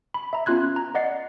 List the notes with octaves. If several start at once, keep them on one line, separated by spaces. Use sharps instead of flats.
B5
E5 A#5
B3 C#4 F4 C6 F#6 G#6
A#5
D5 D#5 F#5 A6 C7